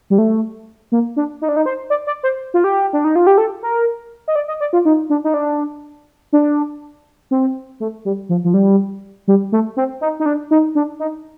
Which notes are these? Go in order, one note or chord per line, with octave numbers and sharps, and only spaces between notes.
G3
A3
A#3
D4
D#4
D4
D#4
C5
D5
D5
C5
F4
G4
D4
D#4
F4
G4
A4
A#4
D#5
D5
D#5
D5
F4
D#4
D4
D#4
D4
D4
C4
A3
G3
F3
F3
G3
G3
A3
C4
D#4
D#4
D4
D#4
D4
D#4